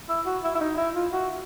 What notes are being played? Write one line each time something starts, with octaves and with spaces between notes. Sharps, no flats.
E4
F#4
E4
E4
D#4
E4
F4
F#4